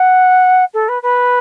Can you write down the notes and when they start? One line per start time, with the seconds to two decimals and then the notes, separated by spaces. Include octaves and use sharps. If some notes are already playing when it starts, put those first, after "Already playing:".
Already playing: F#5
0.74 A4
0.88 B4
1.03 B4